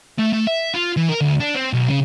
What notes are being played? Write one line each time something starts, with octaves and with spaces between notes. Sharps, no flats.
A3
A3
E5
F4
E3
A#4
D2
D4
C4
B1
C#3